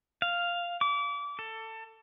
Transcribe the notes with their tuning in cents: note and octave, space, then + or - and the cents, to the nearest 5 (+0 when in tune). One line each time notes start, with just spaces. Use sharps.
F5 +0
D6 -30
A4 +20